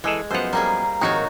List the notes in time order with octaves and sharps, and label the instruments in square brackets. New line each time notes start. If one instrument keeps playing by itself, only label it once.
[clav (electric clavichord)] E3 G#4 A4 [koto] G#3
[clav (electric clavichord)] F#2 F3 B3 [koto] C5 F#5
[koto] G3 A#3 G#4 [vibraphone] A#5
[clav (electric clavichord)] G#1 F2 D#3 [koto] D#4 F#4 C#5